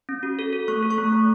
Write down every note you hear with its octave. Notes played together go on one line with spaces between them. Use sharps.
C#4
F#4
A4
A4
A3 C#6
A4
C#6
A3
A3